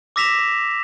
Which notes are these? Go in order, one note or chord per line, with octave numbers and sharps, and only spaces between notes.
D6 E6 A#6 B6 E7 F7